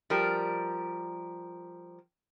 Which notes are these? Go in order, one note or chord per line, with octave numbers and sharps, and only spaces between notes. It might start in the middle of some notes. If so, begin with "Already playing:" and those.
F3 G3 A#4